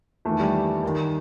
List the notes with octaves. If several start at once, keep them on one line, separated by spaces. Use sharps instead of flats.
E2 D#3 A3
G3
D#2 D#3